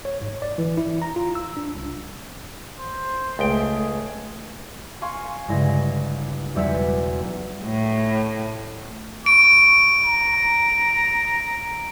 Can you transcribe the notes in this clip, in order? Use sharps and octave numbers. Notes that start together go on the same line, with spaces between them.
C#5
G#2
D5
E3
E4
A#5
F4
E6
D4
C2
C5
C#2 A3 G#4 G5
F5 G#5 C6 C#6
G1 G2 C#3 G#3 E4 A#6
B1 E2 G3 F#5 E6 B6
A2
C#6 D7
A#5